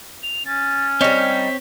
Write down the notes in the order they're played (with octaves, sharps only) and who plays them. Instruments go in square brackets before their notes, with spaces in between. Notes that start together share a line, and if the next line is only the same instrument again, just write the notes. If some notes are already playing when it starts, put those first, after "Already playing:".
[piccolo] F7
[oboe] C#4 [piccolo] A6
[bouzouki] G3 D#4 [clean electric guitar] C4 C#5 [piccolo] B6